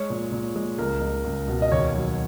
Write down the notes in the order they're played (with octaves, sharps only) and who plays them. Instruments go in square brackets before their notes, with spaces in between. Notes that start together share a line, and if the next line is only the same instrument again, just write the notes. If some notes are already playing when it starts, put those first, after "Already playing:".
Already playing: [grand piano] G#3 C#5
A#2
A#2
G#3
C#2 A#4
G#3
C#2
B2
D#5
D#2 C#5
F#3